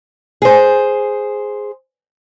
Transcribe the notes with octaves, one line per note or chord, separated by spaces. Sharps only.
G#4 C5